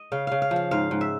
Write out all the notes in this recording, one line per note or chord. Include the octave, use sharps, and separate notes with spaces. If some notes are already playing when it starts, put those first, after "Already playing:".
Already playing: D#5
C#3 F5
C#3 F5
F5
F3
F5
G#2 F5
G#2
E5